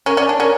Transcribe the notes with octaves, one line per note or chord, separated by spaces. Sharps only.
C#4 A#4
C#4 D5
D4 C#5
C#4 A#4